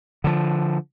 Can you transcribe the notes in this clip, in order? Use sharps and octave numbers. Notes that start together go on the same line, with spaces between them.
D3 F3